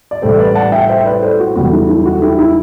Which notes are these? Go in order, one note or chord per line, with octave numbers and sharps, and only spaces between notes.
D5
A1 A2 G3 A4 C5
B4 D5
F#5 A5
E5 G5
C5 E5
B4 D5
A4 C5
F#4
F#1 E2 D3 G3 F#4
E4
E4
F#4
A4
E4 G4
E4